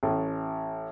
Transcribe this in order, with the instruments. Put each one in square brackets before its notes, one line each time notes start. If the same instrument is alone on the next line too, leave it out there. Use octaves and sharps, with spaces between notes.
[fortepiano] A1